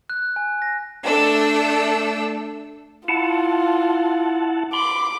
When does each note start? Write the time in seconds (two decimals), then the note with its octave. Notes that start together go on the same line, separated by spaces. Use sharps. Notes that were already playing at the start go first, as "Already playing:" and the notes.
0.10 F#6
0.36 G#5
0.62 A#6
1.04 A3 D4 A4 E6
3.08 E4 F4 F#5 A5
4.73 B5 C6 D6